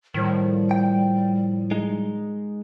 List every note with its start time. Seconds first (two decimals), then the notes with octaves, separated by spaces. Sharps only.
0.14 A2 D#3 F3 G3
0.71 G5
1.71 G#3 D#4